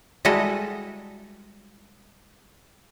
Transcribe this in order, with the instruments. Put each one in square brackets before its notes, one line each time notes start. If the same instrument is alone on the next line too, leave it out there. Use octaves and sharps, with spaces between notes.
[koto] G3 G#3 E4 F#4 A4 D#5